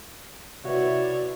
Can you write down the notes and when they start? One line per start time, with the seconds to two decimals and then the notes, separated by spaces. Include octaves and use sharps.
0.64 C3 E4 F#4 B4 C#5 D5 E5